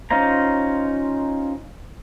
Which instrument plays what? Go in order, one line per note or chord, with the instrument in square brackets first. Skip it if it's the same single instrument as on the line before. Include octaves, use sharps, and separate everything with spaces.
[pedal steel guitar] C#4 D#4 F4 C5 A#5